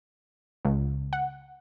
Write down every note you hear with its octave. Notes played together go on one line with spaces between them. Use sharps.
C#2
F#5